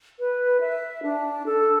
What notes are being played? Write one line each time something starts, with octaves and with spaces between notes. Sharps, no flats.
B4
E5
D4
A4